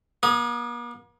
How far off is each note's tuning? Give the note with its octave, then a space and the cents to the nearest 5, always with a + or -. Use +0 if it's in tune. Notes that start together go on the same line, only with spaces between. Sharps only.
A#3 +45 D#6 +0